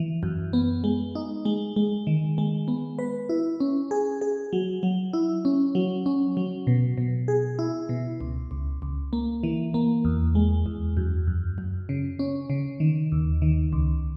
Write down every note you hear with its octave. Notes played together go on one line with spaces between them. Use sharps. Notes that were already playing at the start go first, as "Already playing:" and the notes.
Already playing: E3
F#2
B3
G#3
D#4
G#3
G#3
D#3
G#3
B3
B4
E4
C#4
G#4
G#4
F#3
F#3
E4
C#4
F#3
C#4
F#3
B2
B2
G#4
E4
B2
C#2
C#2
C#2
A#3
E3
A#3
E2
G#3
E2
F#2
F#2
F#2
C#3
C#4
C#3
D#3
D#2
D#3
C#2